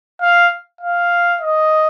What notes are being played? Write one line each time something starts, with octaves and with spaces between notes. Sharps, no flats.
F5
F5
D#5